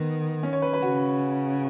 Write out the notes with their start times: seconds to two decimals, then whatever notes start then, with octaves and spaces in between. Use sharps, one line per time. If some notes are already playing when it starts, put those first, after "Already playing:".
Already playing: D#3 B3
0.43 C#4
0.53 C#5
0.62 B4
0.73 B4
0.82 C#3 F#4